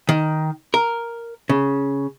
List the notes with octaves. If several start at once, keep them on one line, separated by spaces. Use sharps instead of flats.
D#3
A#4
C#3